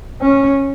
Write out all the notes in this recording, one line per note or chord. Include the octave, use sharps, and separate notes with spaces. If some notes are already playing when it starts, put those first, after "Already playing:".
C#4